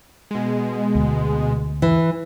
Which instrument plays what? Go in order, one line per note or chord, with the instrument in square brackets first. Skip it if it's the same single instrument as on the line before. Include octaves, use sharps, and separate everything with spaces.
[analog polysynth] B2 G#3
[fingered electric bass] D2
[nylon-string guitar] E3